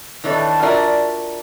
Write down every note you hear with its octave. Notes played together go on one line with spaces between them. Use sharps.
D#3 E3 A3 D4 A4 C#5
D4 F4 F#4 A#4 D5 E5